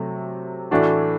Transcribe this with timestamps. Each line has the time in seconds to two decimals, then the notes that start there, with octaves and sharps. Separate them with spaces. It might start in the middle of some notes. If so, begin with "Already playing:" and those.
Already playing: C3 F#3 A3
0.71 A2 E3 A3 D4 F#4